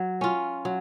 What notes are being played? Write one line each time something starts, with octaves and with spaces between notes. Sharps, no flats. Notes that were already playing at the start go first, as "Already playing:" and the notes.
Already playing: F#3
C#4 F4
F#3